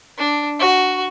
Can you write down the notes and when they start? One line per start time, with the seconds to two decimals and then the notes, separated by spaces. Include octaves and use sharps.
0.18 D4
0.59 F#4